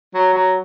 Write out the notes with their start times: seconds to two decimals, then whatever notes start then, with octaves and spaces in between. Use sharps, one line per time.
0.14 F#3
0.34 F#3